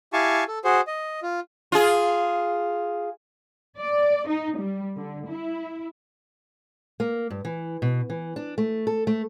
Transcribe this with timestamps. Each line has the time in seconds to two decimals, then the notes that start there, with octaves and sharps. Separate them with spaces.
0.13 E4 G4 F5 G#5 A5 C#6
0.48 A4
0.64 F#4 G#4 C5
0.87 D#5
1.23 F4
1.72 F4 G#4
3.79 D5
4.28 D#4
4.58 G3
4.96 D3
5.29 E4
7.00 A#3
7.30 G2
7.45 E3
7.82 B2
8.10 E3
8.36 D4
8.58 A3
8.87 A4
9.07 A3